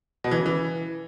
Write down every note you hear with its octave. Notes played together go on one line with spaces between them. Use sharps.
B2
E3
C#3
E3